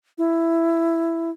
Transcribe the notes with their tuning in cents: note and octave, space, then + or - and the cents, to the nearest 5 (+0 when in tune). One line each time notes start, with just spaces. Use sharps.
E4 +10